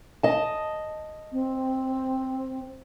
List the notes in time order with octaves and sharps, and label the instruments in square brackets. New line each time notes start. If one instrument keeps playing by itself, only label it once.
[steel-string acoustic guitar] D#5 A5
[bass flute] C4